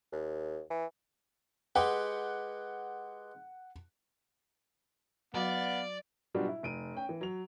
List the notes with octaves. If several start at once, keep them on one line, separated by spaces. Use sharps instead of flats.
D#2
E3
G#3 G4 B4 F#5
F#3 B3 F#4 D5 F5
B2 F#3 G3 D4 F4 F#4
E4
F1 D7 D#7
C#4 G5
E3
F#3 F7